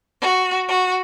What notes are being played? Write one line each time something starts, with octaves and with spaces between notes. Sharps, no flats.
F#4
F#4